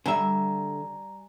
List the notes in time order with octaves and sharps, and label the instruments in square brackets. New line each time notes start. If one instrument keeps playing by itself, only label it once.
[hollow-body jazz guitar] D3 E5 [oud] G3 [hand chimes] G#5 A#5